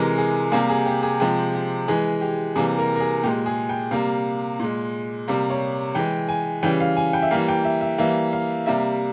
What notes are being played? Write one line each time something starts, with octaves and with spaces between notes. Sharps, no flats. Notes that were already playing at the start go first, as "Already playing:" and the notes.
Already playing: C3 E3 G#3 A#4
G#4
C3 G3 A#3 G#4
G#4
G4
G#4
C3 F3 G#3 G4
G4
E3 G#3 G#4
G4
C3 E3 G3 A#3 G#4
A#4
A#4
G#4
A#2 G#3 G4
G#4
G5
C3 G3 A#3 F5
A#2 G#3
C3 G3 A#3
C#5
E3 G#3 G5
G#5
C#3 E3 G3 G5
F5
G#5
G5
E5
E3 G3 A#3 F5
G5
E5
E5
E3 G3 A#3 E5
F5
C3 G3 A#3 E5